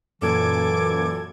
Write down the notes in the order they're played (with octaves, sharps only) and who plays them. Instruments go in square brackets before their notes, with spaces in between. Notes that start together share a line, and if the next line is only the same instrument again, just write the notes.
[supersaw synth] F#2 A#2 G#6 [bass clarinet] E3 [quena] A4 [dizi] D6